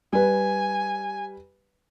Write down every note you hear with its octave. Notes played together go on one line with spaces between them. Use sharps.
G3 B4 G#5